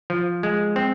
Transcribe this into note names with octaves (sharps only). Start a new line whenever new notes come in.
F3
G#3
C4